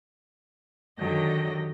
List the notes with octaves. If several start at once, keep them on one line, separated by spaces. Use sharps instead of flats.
F#2 D3 D#3 F#3 G4 D#5